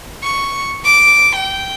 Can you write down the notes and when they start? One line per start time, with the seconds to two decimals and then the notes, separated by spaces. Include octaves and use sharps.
0.23 C#6
0.85 D6
1.36 G5